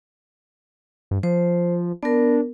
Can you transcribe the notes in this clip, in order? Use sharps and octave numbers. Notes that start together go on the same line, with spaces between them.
G2
F3 C5
B3 D4 A#4